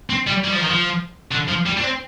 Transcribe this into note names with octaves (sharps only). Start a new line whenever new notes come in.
C4
G3
G3
F3
D#3
F3
D3
F3
G3
D4
C4